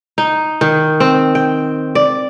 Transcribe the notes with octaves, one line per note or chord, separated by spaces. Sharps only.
D#4
D#3
C4
G5
D5